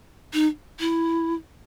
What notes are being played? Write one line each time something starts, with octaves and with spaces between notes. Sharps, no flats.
D#4
E4